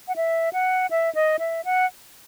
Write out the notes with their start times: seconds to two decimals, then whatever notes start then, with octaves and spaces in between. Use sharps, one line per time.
0.08 F#5
0.16 E5
0.53 F#5
0.91 E5
1.15 D#5
1.39 E5
1.65 F#5